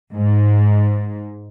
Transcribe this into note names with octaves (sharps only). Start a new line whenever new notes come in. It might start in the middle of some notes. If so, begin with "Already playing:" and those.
G#2